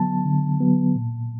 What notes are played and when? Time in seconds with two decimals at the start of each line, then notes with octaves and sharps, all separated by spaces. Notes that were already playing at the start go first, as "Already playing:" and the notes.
Already playing: D3 F#3 B3 A5
0.25 D3
0.60 F#3 B3
0.95 A#2